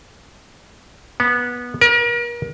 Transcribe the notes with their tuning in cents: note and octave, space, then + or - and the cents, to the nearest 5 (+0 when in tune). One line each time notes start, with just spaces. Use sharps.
B3 -20
A#4 +35